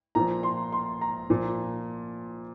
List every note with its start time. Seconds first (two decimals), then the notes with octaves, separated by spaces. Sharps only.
0.15 A#2 F3 A#5
0.43 C6
0.72 C6
1.01 A#5
1.30 A#2 F3